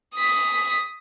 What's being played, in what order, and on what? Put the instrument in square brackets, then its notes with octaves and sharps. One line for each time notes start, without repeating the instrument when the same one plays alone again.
[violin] D#6 B6